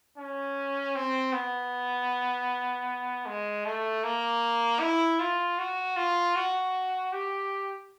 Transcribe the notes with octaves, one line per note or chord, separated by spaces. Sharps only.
C#4
C4
B3
G#3
A3
A#3
E4
F4
F#4
F4
F#4
G4